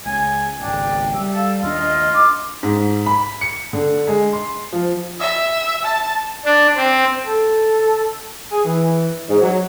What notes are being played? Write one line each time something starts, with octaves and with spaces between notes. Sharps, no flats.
C#2 G#5
G#1 C#2 D4 G5
G3 E5
A4 F5
D#2 G#3 D4 F4 D#5
D6
G#2
B5
C#7
D3
G#3
C6
F3
E5
A5
D4
C4
A4
G#4
E3
G#2
F#3